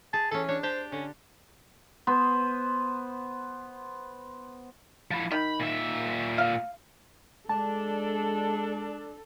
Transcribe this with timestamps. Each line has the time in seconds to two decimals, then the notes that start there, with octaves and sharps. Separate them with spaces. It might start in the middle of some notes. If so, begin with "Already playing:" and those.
0.13 G#4 A5
0.32 E3 C#4 A4
0.49 D4 C#5
0.63 G4 C5 G5 A5
0.92 D3 C#4
2.07 B3 C5
5.11 F3 E4
5.32 D#3 B5
5.60 A#2 E5
6.38 F5
7.49 G#3 D4 A4 A5